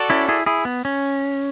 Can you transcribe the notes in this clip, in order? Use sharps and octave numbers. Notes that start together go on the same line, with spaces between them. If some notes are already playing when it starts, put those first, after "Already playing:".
Already playing: F#4 A4 D5
C#4 E4
E4 G#4
E4 G#4
B3
C#4